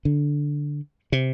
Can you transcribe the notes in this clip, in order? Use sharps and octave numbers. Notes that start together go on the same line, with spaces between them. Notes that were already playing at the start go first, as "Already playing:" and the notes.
D3
C3